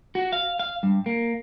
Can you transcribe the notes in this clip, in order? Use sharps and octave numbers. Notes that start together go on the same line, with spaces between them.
F#4
F5
F5
G2
A#3